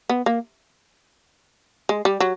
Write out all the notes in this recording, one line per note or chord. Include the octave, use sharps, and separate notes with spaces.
B3
A#3
G#3
G3
F#3